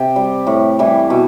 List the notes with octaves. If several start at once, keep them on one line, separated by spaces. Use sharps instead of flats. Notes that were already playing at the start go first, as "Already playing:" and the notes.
Already playing: C3 G4
G3
A2
E3 G3
B2